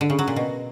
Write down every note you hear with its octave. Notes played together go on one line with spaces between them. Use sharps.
D3
C#3
F#3
A#2
B2